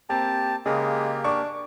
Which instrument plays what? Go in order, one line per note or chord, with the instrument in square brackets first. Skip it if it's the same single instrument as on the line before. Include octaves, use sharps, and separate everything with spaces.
[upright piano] A#3 C4 [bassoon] G4 [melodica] A5
[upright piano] C#3 [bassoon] G#3 [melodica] A#3 G4
[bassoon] D4 [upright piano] C#6 D6